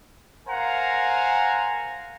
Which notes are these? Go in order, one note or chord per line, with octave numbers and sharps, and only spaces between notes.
A#4 C5 F5 F#5 G#5 A#5